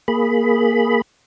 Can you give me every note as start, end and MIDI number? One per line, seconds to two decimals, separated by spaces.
0.08 1.01 58
0.08 1.01 68
0.08 1.01 83